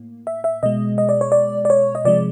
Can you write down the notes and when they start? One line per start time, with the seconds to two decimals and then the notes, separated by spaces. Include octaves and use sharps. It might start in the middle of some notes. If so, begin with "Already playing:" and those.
Already playing: A2 A#3
0.27 E5
0.44 E5
0.63 B2 G#3 D#5
0.98 D#5
1.09 D5
1.21 C#5
1.32 D5
1.65 D5
1.70 C#5
1.95 D#5
2.05 C3 F3 G#3 D5